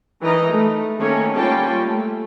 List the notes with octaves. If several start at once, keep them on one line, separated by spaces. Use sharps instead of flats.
E3 D#4 A#4 B4 D#5 A#5
A3
D#3 A3 A#3 C#4 C#5
G3 A#3 C#4 F4 G5 A5
A3